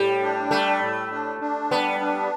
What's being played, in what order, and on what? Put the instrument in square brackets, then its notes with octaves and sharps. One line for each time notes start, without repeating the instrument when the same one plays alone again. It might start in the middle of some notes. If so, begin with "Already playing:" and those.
Already playing: [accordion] A2 [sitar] G3
[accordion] D4
[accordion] G3 [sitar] A3
[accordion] A2
D4
D4
[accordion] G3 [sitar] B3
[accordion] D4